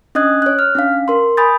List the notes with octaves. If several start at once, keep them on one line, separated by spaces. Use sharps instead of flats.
C#4 D4 D#5 D#6 F#6 G#6
C#5 F#6
F6
C#4 D4 F5
A#4 C6
G#5 B5 D#6 G6 A6